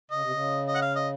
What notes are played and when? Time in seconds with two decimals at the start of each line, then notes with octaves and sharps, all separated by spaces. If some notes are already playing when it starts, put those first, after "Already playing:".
0.11 C#3 D#5
0.22 C3
0.31 C#3
0.68 D#5
0.75 F#5
0.82 F5
0.96 D#5